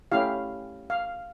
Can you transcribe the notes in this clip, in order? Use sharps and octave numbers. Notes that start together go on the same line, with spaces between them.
A3 C#4 E4 G4 F5
F5